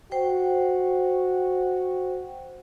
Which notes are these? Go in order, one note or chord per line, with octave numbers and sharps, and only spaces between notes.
F#4 C5 G5